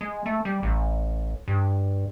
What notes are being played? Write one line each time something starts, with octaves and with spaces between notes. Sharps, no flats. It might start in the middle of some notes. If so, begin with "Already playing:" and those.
G#3
A3
G3
A1
G2